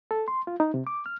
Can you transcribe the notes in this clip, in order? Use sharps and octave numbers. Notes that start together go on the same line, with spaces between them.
A4
C6
F4
D#4
C3
D6
F6